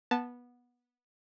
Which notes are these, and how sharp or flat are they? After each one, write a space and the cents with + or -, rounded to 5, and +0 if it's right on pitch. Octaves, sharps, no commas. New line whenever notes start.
B3 -15 A5 +0